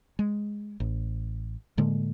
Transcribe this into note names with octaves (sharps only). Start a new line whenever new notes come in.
G#3
A1
A2 D3 G#3 A#3